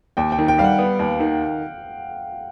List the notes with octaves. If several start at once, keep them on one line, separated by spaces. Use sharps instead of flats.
D#2 G5
G5
D#3
G5
G3 F5
F#5
B3
D#2
D#3